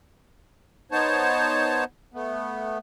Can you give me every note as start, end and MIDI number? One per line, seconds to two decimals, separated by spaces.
0.92 1.84 59
0.92 1.84 63
0.92 1.84 72
0.92 1.84 73
0.92 1.84 81
2.14 2.78 57
2.14 2.78 59